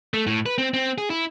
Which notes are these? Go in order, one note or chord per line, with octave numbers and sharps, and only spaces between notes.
A3
A2
B4
C4
C4
G#4
E4